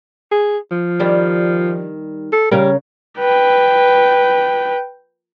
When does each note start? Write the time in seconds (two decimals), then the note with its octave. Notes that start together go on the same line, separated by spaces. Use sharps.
0.31 G#4
0.71 F3
1.00 D#3 G3 D4
2.32 A4
2.51 C#3 G3 C#4 A#4
3.19 B4 G5